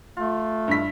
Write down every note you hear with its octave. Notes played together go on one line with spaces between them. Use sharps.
A3 F4
G2 E4 B6